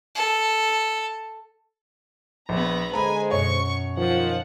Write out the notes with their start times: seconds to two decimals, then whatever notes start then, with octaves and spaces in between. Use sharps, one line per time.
0.15 A4
2.49 A#1 B3 A#5
2.93 D3 G#3 C5 G#5 A#5 B5
3.31 F#2 B2 C#5 C#6
3.98 D#3 F3 F#5